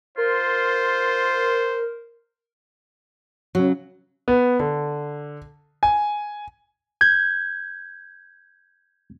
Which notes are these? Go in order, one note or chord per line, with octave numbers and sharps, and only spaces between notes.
F4 A#4 C5
C#3 F#3 F#4
B3
D3
G#5
G6 G#6